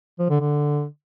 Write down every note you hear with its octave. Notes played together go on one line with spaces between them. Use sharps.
F3
D3
D3